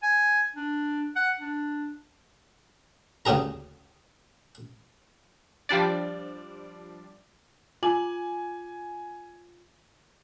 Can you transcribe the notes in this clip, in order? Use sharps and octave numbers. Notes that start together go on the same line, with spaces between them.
G#5
D4
F#5
D4
D2 C#3 G4 G#4 A#5
F3 G3 D4 D5
F4 G#5 D6 F#7